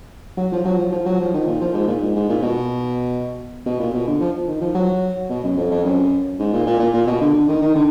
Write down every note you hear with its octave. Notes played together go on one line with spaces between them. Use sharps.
F#3
F3
F#3
F3
F3
F#3
F3
D#3
A#2
F3
G#2
A#2
G#2
G#2
A#2
B2
B2
A#2
B2
D3
F3
D#3
F3
F#3
B2
F#2
F2
F2
F#2
G#2
A#2
A#2
A#2
A#2
B2
D3
D3
D#3
D#3
D3